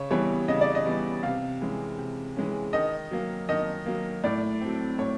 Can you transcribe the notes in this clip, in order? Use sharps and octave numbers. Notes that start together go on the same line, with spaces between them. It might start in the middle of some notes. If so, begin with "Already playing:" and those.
Already playing: C#3 C#5
E3 G3 B3 C#5
C#3 D#5
D5
D#5
E3 G3 B3
C3 F5
E3 G#3 C#4
C3
E3 G#3 C#4
D#3 D#5
F#3 A#3
D#3 D#5
F#3 A#3
A2 D5
F#3 A3 C4
A2 C#5